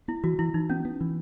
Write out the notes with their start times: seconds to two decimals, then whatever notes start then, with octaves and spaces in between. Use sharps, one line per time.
0.08 B3 E4
0.24 E3 F#4
0.39 E3 E4
0.54 E3 D#4
0.70 B3 C#4
0.85 B3
1.01 E3